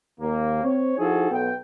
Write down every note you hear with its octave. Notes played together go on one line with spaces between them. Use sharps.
D#2 A#3
C4 C#5
F3 D#4 E4 F#4 G#4 A4
B1 B3 A4 G5